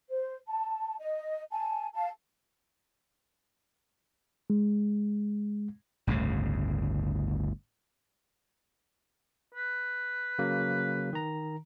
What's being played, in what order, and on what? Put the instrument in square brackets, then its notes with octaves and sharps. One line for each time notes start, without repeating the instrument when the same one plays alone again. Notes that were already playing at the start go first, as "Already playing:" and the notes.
[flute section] C5
A5
D#5
G#5 A5
F5 A5
[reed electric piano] G#3
[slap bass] G1 D2 A2 C#3
[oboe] B4
[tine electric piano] C#3 F#3 A#3
D#3 A#5